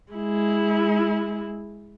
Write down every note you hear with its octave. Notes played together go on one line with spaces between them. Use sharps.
G#3 E4